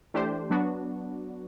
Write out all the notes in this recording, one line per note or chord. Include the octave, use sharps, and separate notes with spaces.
E3 A3 D4 G4 C5
F#3 B3 D4 F#4